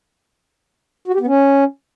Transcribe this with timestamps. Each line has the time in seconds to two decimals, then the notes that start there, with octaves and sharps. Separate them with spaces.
1.08 F#4
1.14 G4
1.21 B3
1.27 C#4